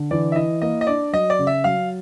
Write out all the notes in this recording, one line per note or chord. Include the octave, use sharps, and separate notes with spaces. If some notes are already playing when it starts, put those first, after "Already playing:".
Already playing: D3
E3 D5
E5
E4 D#5
A#3 D#5
D#5
D4 D5
F#3 D#5
D5
C#3
E5
F#3 F5